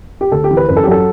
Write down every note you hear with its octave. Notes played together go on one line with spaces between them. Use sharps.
G4
D2 A4
G4
E3
B4
F#2 B4
A4
G4
F#3 A4